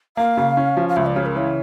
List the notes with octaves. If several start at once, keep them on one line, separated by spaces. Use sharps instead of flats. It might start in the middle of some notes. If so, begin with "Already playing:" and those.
A#3 F5
C#3
C#4
F3
F5
C#2 E5
D5
C#3 C#5
A#4
E3 C#5